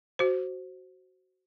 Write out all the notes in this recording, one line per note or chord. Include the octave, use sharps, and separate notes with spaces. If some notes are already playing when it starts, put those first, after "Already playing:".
F#4 C5